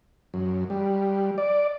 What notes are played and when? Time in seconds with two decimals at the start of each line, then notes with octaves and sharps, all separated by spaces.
0.34 F#2
0.70 G3
1.38 D5